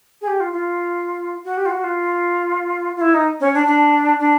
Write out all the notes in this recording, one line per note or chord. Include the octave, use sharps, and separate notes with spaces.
G#4
G4
F4
F4
F#4
G4
F4
F#4
F4
F4
E4
D#4
C#4
D4
D4
D4